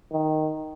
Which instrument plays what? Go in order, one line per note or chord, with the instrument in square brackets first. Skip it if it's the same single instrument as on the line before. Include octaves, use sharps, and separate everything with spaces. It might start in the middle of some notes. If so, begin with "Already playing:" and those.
[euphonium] D#3